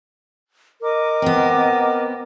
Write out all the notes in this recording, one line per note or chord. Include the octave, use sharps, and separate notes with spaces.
A#4 D#5 D6
B3 C4